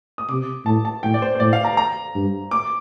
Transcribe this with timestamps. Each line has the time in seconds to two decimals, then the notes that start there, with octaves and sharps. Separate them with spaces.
0.18 D#6
0.29 C3 D6
0.66 A2 A5
0.85 A5
1.03 A2 G5
1.14 D5
1.22 C5
1.35 C5
1.40 A2 D5
1.53 F5
1.65 A#5
1.77 A#5
2.15 G2
2.51 D6